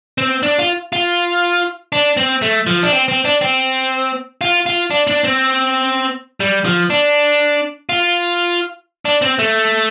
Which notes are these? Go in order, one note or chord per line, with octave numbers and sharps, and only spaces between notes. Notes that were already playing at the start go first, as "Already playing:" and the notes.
C4
D4
F4
F4
D4
C4
A3
F3
D4
C4
C4
D4
C4
F4
F4
D4
D4
C4
G3
F3
D4
F4
D4
C4
A3